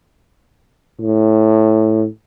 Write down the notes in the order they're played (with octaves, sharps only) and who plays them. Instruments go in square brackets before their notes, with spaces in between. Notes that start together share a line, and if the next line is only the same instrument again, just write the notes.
[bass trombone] A2